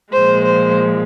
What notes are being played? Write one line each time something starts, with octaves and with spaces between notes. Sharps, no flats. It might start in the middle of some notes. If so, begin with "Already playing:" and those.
A#2 F3 G#3 C5
C5